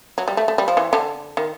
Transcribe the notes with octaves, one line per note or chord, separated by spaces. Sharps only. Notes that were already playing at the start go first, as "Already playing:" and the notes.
F#3
G3
A3
A3
G3
F3
E3
D3
D#3